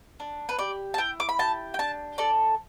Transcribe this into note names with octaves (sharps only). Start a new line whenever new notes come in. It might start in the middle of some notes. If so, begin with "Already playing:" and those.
D4
B4
G4 D5
A5
E4 G5
D6
B5
G4 A5
G5
D4 A5
A4 D5